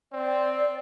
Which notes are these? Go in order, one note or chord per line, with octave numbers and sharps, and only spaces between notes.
C4 D5